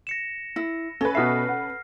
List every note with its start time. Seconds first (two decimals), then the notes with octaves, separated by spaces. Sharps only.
0.07 A#6 C#7 E7
0.56 E4 A#6
1.01 C#4 A4 B4
1.15 B2 F#4 E5 F6 C7
1.49 F#5